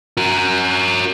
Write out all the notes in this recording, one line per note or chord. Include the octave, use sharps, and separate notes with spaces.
F#4 A#4